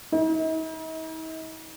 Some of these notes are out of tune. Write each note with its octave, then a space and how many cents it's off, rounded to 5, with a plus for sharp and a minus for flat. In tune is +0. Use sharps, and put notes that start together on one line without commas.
D#4 +45